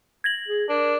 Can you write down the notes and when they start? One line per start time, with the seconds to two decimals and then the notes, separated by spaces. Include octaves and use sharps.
0.24 G#6 A#6 F#7
0.49 G#4
0.69 D4 A#4